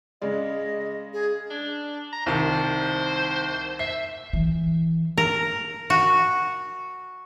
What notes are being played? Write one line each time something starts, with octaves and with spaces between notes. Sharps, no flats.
C#3 G#3 D5 D#5
G#4
D4
A#5
C2 D#3 C5 A5
E5 C7
E3
A#4
F#4